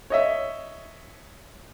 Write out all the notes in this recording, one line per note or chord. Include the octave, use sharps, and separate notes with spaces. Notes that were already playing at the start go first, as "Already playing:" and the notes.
C#5 D#5 E5